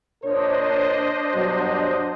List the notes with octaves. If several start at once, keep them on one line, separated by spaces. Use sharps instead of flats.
A#2 D4 A#4 C5 C#5 D#5
G2 B2 F#3